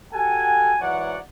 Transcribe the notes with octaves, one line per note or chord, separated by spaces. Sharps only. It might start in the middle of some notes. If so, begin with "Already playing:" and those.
F#4 G4 A4 F#5 G#5
G#2 E3 F#3 C#5 D5 F#5